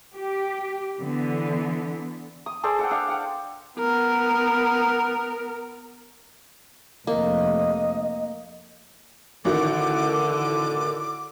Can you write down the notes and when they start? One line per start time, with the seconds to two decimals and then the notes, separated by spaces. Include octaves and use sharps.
0.14 G4
0.99 D3 E3 B3
2.46 D#6
2.63 G#4 A4 C5 D5
2.79 A4 F#5 G5
2.91 D4 F5
3.09 F#5 G5
3.79 B3 A#4
7.07 F1 F2 A#3 D#5
9.45 A1 D3 D#3 F#4 D6